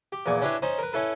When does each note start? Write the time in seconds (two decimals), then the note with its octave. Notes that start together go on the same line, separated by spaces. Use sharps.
0.12 G4
0.26 E2 A#2 D5 G#5 C#6
0.42 C#4 D4 E4 G4 B4 C#5
0.62 C#4 D#4 C5
0.79 A#4 B4
0.93 C#4 E4 A4 B4